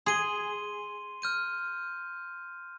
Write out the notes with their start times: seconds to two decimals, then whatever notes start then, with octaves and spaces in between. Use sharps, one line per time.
0.06 G#4 C6 D#7 G7
1.22 F6 G6 D#7